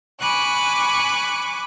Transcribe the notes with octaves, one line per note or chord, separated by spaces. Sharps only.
G#5 B5 C#6 D6 F#6